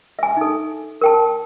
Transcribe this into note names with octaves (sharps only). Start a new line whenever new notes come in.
E5 G#5
D#4 A4
A#4 G5 A5